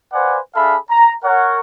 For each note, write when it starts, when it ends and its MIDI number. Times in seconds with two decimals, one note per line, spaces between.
0.12 0.38 71
0.12 0.38 72
0.12 0.38 74
0.12 0.38 77
0.12 0.38 78
0.12 0.38 80
0.54 0.76 62
0.54 0.76 68
0.54 0.76 69
0.54 0.76 76
0.54 0.76 77
0.54 0.76 83
0.89 1.13 82
1.24 1.60 70
1.24 1.60 73
1.24 1.60 78